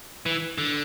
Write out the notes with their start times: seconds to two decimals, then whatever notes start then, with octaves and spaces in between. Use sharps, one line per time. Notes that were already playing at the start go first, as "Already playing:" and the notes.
0.26 E3
0.58 D3